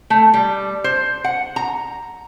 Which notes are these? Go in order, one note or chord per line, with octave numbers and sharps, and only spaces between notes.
A3
G3
C5
F#5
A#5